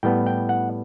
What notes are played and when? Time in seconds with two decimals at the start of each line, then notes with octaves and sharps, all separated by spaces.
0.03 A2 G3 B3 G5
0.26 G5
0.49 F#5